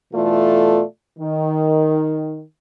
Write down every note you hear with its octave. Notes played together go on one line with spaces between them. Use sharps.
B2 E3 A3 F4 A4 D5
D#3